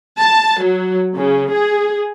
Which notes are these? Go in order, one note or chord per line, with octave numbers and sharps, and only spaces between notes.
A5
F#3
C#3
G#4